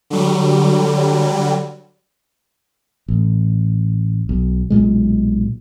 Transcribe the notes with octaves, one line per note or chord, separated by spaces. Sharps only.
D3 F#3 G3
A1
B1
B1 A#2 G#3